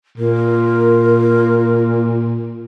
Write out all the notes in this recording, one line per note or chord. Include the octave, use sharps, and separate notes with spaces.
A#2 A#4